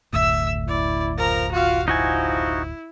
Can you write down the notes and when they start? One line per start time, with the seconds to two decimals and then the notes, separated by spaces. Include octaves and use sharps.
0.13 F#1 D2 A2 E5 E6
0.68 E4 D5
1.18 F3 A#4 A#5
1.52 F4 F#4 F5
1.88 F3 D#4 E4 F#4 G#5